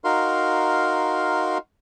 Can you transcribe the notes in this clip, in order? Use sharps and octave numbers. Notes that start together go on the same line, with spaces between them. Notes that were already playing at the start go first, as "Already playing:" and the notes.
D#4 F#4 A#4 F5 C6